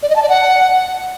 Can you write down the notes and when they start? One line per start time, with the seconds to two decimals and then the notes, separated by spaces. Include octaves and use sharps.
0.03 D5
0.09 D#5
0.16 A5
0.22 D5
0.29 F#5